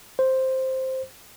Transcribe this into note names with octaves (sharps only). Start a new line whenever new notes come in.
C5